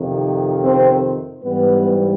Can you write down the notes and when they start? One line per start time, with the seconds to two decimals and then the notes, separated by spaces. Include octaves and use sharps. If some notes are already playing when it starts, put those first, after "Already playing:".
Already playing: F2 C3 D#3
0.65 C4 C5
1.43 G#2 E3 G3 B3 B4